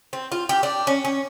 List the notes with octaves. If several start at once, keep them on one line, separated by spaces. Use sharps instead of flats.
C4
F4
G4
D4
C#4
C#4